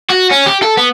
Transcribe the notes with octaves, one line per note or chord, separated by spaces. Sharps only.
F#4
C#4
G4
A4
B3